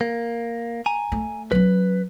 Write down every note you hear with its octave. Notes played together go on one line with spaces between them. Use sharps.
A#3
G#5 A#5
A3
F#3 C#4 B4